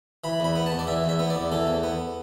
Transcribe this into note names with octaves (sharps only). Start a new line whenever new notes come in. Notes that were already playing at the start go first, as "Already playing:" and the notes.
E3 B5
E2 B5
B3
A5
E2
D5
E3 E5
E2 E5
B3
D5
E2
E3 A4
E2
B3